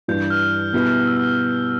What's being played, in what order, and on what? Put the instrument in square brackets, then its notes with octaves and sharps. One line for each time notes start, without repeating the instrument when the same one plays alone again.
[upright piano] G2 E3 G3 D4 [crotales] G6
[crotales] G6
F6
[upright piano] B2 G3 B3 E4 B4
[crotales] E6
F6